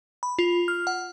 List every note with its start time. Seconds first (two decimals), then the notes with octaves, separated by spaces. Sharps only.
0.23 B5
0.39 F4
0.68 F6
0.87 F#5